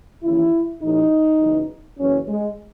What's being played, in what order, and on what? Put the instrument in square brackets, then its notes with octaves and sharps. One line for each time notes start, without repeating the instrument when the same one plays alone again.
[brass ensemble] D#2 C#3 E3 E4
A1 A2 E3 D#4
F#1 E2 C#3 E3
F#1 F#2 E3 C#4
G#3